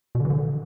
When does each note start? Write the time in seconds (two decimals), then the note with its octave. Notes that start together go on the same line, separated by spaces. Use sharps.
0.15 B2
0.20 D3
0.25 E3
0.30 D3